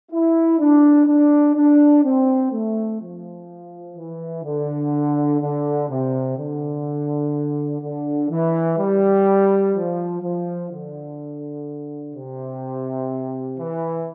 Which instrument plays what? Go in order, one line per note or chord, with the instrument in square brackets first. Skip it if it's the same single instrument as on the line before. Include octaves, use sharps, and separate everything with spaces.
[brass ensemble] E4
D4
D4
D4
C4
A3
F3
E3
D3
D3
C3
D3
D3
E3
G3
F3
F3
D3
C3
E3